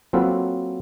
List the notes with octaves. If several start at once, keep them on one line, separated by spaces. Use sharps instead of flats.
F#3 A#3 C4 F4 A4 B4